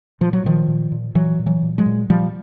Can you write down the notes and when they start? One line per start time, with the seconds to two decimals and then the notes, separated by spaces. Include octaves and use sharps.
0.21 A#2 F3
0.33 F#3
0.44 A#2 D#3 F3
0.68 A#2
0.92 A#2
1.15 A#2 E3 F#3
1.39 A#2
1.46 E3 F#3
1.62 A#2
1.78 F#3 G#3
1.86 A#2
2.09 A#2 F3 G3